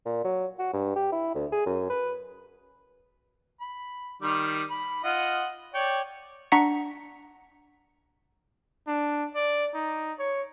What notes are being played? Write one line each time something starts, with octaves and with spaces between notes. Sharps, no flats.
A#2
F#3
F#4
G2
G4
E4
D2
G#4
F#2
B4
B5
D#3 G3 D6
B5
F4 D#5 F#5
C#5 D5 G5
D4 F#5 A#5 C#6 B6 C#7
D4
D5
D#4
C#5